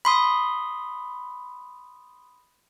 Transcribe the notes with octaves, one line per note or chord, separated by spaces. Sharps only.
B5 C6 D#6